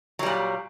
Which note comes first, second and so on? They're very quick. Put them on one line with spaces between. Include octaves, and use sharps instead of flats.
F#3 G3 A#2